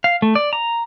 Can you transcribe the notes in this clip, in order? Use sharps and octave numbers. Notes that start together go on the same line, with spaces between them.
F5
A3
D5
A#5